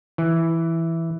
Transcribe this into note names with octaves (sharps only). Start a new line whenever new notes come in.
E3